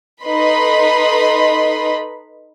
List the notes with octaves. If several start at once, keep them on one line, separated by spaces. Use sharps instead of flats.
D#4 A4 B4 D#5 B5 C6